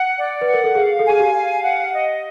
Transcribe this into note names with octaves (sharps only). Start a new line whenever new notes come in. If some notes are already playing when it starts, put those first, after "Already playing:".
Already playing: F#5
D5
B4
F#5
A#4
A4
G#4 F5
A4
G#4 G#5
G4
F5
F#5
D#5